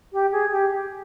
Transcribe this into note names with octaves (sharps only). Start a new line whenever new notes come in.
G4
G#4
G4